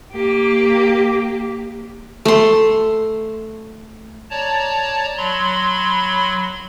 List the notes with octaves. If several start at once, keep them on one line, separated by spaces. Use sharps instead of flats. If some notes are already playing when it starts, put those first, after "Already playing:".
A#3 G4
A3 C6
C#5 D5 A5 A#5
F#3 B5 C6